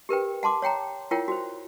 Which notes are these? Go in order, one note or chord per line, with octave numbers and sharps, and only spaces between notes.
G4 A#4 B4 G5
F#5 A5 C6 D6
C#5 F#5 G5 A#5
E4 F4 A#4 C#5 F#5 G5
F#4 C5